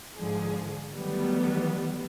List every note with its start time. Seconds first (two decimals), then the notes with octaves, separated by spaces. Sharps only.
0.16 G#2 D3 F3 G#4
0.94 D#3 E3 F#3 G3 A3 B3